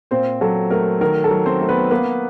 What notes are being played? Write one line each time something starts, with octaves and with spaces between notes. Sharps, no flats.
A#2 C4 C5
F#3 A4
A3 A#4
D#3 A#4
A4
F#3
C4 C5
A3
B3 B4
A#3 B3 B4